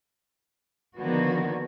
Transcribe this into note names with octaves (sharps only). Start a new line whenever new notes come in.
D3 D#3 F3 A#3 B3 F#4